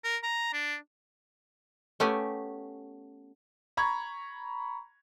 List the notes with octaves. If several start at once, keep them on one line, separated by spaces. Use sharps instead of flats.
A#4
A#5
D4
A3 B3 C#4 G4 G#5
A#5 B5 C#6 G#6